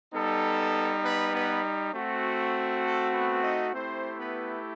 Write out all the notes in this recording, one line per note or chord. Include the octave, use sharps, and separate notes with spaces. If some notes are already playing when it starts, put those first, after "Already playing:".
G3 B3 D#4 A4
B3 B4
B3 B4
A3 C4 F#4
A4
B3 B4
D#4 D#5
A3 C4 E4 G4 C5
B3 B4